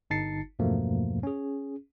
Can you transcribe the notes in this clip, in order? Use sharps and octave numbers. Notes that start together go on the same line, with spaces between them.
G1 D#4 A5 A6 C7 C#7
E2 G2 B2 F3 A3 A#3
C#4 G#4